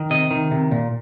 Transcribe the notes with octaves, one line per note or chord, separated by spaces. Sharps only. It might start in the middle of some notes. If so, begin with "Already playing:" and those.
Already playing: D#3
C3 D#5
D#3
C3
A#2